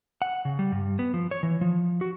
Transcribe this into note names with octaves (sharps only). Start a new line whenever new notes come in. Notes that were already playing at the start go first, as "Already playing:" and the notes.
F#5
C#3
G3
G2
B3
F3
C#5
E3
F3
F#4